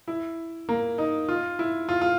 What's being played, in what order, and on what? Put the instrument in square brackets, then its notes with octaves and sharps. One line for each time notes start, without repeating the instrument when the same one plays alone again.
[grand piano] E4
A#3
D#4
F4
E4
F4
F4